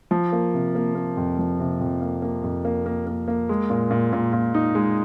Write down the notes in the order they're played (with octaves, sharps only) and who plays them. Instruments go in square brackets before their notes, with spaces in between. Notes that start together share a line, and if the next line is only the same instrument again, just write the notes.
[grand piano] F3
A#3
C3
A#3
A#3
F2
F3
C3
F2
A#3
A#3
F2
A#3
A#3
A#3
A#3
G#3
A#2
A#2
A#2
A#2
D#4
G#3